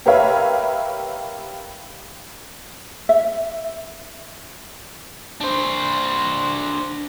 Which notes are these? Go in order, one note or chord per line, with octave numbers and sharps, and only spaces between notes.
G4 A#4 B4 C#5 E5 F5
E5
D4 C5